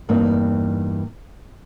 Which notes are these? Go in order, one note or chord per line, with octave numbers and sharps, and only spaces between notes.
E2 G2 A#3 C4 D#4